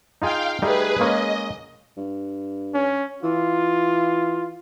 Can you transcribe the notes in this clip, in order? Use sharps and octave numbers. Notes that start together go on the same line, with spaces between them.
D#4 F4 G#4 F5 G5
G3 A3 D#4 G#4 B4
G#3 A#3 C#4 D#5
G2
C#4
E3 F4